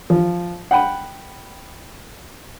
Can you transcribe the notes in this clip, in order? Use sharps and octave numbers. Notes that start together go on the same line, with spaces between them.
F3
F#5 G5 B5